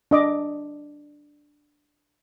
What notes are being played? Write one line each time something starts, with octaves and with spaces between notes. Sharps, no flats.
D4 D#5 D6